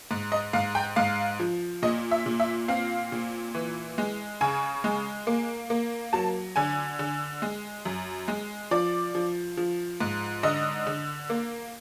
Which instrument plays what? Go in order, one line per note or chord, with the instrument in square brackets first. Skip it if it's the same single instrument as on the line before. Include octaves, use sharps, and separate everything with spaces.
[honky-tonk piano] G#2
D#5
G#2 F5
G5
G#2 F5
F3
A#2 D#5
E5
A#2
E5
C4 F5
A#2
E3
G#3
C#3 G#5
G#3
A#3
A#3
F#3 A5
D3 G#5
D3
G#3
F#2
G#3
F3 D5
F3
F3
G#2
D3 D#5
D3
A#3